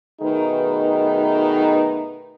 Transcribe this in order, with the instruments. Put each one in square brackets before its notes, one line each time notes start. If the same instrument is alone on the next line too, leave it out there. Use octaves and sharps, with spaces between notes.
[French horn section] B2 D#3 A3 D#4 G#4 B4